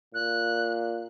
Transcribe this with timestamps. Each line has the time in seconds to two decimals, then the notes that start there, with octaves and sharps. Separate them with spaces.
0.14 A#2 F#6